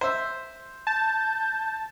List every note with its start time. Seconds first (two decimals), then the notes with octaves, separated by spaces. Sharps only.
0.01 C5 E5
0.87 A5 G6